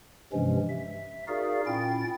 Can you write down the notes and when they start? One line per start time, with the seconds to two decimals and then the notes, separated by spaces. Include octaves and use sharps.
0.33 G2 C3 E3 F3 G#3 C#4
0.69 E5
1.28 D#4 F#4 G#4 A#4 D5 F5
1.66 A#2 C#4 E4 G5 A6